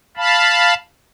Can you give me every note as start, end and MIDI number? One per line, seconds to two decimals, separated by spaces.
0.17 0.74 77
0.17 0.74 81
0.17 0.74 83